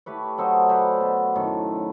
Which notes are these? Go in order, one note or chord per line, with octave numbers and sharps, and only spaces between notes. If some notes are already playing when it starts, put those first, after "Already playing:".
A3 G4 B4 C#5
F#3 A4 C5 D#5
B4 C5 D5 G5
B2
F#2 A2 D#3 A4